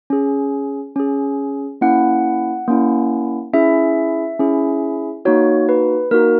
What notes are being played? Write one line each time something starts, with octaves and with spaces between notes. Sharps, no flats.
C#4 G#4
C#4 G#4
A#3 C#4 E4 F#5
A#3 C#4 E4
C#4 E4 G#4 E5
C#4 E4 G#4
A#3 D#4 F#4 C#5
B4
A#3 D#4 F#4 A#4